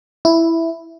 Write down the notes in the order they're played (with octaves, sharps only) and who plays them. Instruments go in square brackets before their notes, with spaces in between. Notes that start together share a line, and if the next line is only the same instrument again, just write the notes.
[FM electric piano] E4